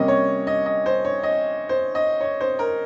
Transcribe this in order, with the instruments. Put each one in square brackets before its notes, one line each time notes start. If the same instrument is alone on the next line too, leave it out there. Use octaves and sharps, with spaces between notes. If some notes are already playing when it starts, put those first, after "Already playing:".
Already playing: [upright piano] C3 G3 A#3 C#4 D#5
C#5
D#5
D#5
C5
C#5
D#5
C5
D#5
C#5
C5
A#4